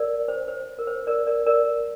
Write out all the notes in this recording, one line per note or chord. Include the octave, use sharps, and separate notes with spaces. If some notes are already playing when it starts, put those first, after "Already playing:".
Already playing: A#4 D5
C5
C5
A#4
C5
A#4 D5
A#4 D5
A#4 D5